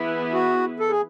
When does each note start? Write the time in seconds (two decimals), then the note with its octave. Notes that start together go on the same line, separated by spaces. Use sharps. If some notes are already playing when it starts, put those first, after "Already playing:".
Already playing: E3 B3 E4 G#4 B4
0.34 F#4
0.80 A4
0.90 G#4